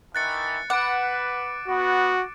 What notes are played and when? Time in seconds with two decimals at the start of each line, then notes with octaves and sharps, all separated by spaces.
0.15 D#3 E3 F#6 A6 C#7
0.70 B4 F#5 D6 D7
1.68 B3 F#4